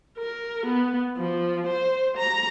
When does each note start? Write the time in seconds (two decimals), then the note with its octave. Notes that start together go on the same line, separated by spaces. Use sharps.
0.18 A#4
0.66 B3
1.17 F3
1.67 C5
2.17 A#5